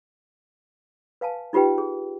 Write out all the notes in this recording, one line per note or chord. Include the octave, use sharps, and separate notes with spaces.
B4 F5 G#5 A5
D#4 F4 G4 B4 G5
G#4